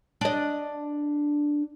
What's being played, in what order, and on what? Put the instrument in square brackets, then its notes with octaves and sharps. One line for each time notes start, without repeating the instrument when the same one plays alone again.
[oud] D4 D#5